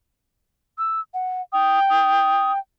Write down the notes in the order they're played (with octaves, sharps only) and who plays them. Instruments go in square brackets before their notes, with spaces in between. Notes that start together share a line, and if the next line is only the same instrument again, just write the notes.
[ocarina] E6
F#5
[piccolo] G5 [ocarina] D#6
[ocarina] D#6